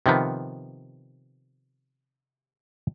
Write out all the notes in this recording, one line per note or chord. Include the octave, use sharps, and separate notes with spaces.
C3 D#3 F3 B3